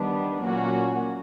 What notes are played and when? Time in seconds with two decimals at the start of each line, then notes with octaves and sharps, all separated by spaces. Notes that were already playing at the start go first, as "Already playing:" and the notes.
Already playing: D#3 G3 B3 D4
0.44 A#2 F#3 A#3 C#4 F#4